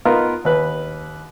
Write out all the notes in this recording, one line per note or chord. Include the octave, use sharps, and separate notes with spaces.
B3 D#4 F4 A#4 B4
D#2 B4